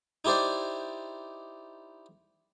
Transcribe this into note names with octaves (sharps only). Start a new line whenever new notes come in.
D#4 E4 G4 C5 D5